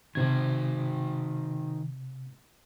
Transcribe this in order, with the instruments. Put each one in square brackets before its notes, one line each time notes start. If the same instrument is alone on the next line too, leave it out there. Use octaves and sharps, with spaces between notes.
[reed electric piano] C3 G#6 [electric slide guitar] D#3 C5